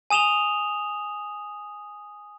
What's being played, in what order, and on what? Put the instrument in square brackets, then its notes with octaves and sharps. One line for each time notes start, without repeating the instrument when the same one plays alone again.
[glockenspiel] G#5 D#6 E7 F7 G7